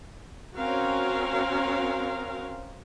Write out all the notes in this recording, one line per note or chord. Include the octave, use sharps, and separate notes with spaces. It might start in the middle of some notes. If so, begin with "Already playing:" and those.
C4 C#4 F#4 A#4 F5